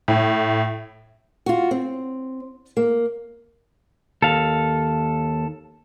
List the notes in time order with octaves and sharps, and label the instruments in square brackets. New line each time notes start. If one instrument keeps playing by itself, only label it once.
[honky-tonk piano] A2
[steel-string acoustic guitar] F4 F#4
C4
A#3
[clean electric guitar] D#2 [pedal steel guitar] A4 F5